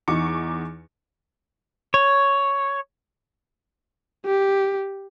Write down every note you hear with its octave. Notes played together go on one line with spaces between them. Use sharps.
E2 D#4 C#6 D6 C#7
C#5
G4